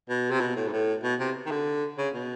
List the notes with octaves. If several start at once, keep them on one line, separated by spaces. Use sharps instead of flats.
B2
C3
B2
A2
G#2
A2
B2
C3
D#3
D3
C#3
B2